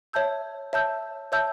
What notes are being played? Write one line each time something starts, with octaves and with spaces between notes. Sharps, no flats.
C#5 E5 A5 E6 G6
C#5 E5 A5 E6 G6
C#5 E5 A5 E6 G6